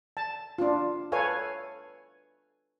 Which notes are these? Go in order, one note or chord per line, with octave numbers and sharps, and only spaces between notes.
A5
D4 F4
A4 B4 C#5 F5 G#5